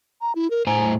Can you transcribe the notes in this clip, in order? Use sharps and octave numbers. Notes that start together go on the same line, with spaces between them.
A#5
E4
A#4
A2 C5 G#5 A#5